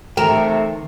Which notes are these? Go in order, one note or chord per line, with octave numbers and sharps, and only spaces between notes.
C3 D#3 E3 A3 A#4 G5